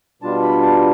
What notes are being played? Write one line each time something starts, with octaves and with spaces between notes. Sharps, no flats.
B2 G3 D4 F4 A5
B5
A5